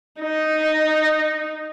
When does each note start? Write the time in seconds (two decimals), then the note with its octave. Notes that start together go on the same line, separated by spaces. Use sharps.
0.20 D#4